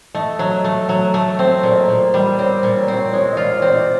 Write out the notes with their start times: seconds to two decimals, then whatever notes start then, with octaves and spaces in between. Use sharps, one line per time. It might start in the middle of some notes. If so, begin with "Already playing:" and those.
0.15 A3 D#5
0.39 F#3
0.64 A3
0.89 F#3
1.14 A3
1.39 C4
1.63 A#2 D5
1.72 D#5
1.80 D5
1.88 A#2
2.14 G3
2.38 C4 C#5
2.56 C5
2.63 A#2
2.76 C#5
2.88 C4
2.94 C#5
3.13 G#3 C#5
3.32 D#5
3.37 F4 D5
3.58 C#5
3.62 C4 D5
3.75 D5